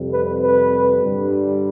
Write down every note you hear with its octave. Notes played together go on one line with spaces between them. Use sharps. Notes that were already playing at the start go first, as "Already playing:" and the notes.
Already playing: F2 C3 G3
B4
B4
G2 D3 G3